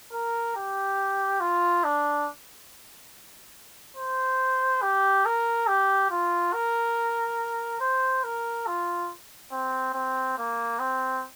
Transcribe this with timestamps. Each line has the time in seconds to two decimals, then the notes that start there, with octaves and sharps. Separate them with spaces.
0.12 A#4
0.56 G4
1.40 F4
1.84 D4
3.97 C5
4.82 G4
5.25 A#4
5.67 G4
6.11 F4
6.53 A#4
7.80 C5
8.24 A#4
8.67 F4
9.52 C4
9.94 C4
10.38 A#3
10.79 C4